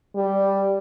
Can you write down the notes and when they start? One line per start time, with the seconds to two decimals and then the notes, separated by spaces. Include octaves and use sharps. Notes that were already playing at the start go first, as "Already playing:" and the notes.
0.15 G3